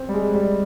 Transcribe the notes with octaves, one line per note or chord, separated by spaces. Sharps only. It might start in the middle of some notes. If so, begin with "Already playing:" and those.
Already playing: C4
G3
G#3
G3